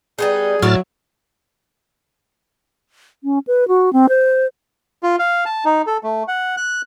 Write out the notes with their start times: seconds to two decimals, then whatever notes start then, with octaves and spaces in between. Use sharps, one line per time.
0.19 G3 B3 D#4 G#4
0.62 A2 F#3 E4 C#5 F6 A6
3.24 C#4
3.47 B4
3.68 F#4
3.93 C4
4.09 C5
5.03 F4
5.19 F5
5.46 A5
5.65 D#4
5.87 A4
6.03 A3
6.28 F#5
6.57 F#6